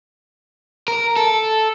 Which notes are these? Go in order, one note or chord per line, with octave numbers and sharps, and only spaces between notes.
A#4
A4